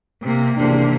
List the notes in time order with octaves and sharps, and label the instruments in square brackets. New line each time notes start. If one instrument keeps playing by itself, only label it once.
[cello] C3 A#3
[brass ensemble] G#1 E2 D4 [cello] C3 A#3